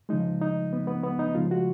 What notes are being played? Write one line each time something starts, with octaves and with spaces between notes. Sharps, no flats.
C#3 F3 G#3 D#4
D#4
B3
B3
B3
D#4
C#3 F3 G#3 F4
F#4